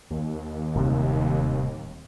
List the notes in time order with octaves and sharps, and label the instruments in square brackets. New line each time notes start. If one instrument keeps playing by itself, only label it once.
[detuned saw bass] D#2
[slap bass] D1 C3 G3